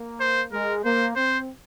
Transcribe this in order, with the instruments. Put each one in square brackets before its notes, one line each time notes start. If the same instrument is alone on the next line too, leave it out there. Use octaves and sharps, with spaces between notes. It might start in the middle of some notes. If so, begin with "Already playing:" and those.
Already playing: [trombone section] A#3
[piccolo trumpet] C5
[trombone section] G#3 [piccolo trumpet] A#4
[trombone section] A#3 [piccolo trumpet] C5
[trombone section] C4 [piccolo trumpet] C5